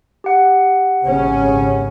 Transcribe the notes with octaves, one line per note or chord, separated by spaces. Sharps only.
G4 F#5
G#1 C#3 C#4